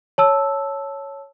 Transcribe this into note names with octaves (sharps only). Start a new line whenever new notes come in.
C#5 A5 E6